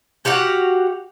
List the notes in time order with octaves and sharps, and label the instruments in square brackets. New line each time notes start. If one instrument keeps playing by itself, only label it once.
[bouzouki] F#4 G4 F5 F#5